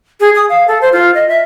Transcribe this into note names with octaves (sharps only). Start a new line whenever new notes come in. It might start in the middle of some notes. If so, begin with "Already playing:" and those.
G#4
D#6
F5
A4
C5
F4
D#5
E5